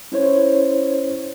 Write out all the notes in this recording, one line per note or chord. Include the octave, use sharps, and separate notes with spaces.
C#4 E4 C5 C#5